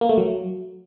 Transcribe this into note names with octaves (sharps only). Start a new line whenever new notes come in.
A#3
A3
F#3